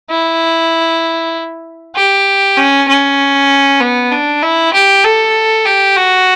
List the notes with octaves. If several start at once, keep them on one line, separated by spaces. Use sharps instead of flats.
E4
G4
C#4
C#4
B3
D4
E4
G4
A4
G4
F#4